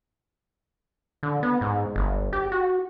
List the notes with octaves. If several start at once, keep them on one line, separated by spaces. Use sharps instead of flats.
D3
B3
G#2
G1
G4
F#4